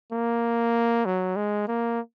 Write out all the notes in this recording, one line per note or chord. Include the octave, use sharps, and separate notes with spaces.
A#3
F#3
G#3
A#3